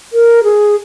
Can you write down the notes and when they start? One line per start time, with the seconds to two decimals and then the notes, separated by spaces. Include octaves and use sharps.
0.13 A#4
0.43 G#4